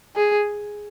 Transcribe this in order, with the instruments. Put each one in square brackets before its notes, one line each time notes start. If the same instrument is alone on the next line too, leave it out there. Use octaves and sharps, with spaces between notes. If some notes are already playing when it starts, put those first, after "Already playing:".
[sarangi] G#4